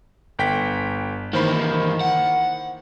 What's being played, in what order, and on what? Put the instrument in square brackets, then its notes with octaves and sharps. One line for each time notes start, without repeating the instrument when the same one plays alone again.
[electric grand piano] G1 G5 B6
[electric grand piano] D#3 C5 B5 [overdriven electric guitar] E3 A#3
[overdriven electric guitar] F#5